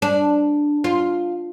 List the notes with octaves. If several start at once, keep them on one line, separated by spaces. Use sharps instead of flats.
D4
F4